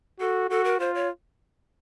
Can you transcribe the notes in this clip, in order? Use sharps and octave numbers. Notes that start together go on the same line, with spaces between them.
F#4 A4
F#4 A4
A#4
F4 C5
C#5